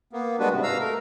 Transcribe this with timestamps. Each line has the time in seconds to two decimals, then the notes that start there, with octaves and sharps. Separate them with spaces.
0.13 A#3 B3
0.39 G3 G#3 B3 D4 F#4 B4
0.52 G#2 C3
0.63 F5 A#5 E6
0.80 A3 A#4